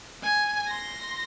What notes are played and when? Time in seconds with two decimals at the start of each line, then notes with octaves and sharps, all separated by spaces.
0.23 G#5
0.68 C6 A#6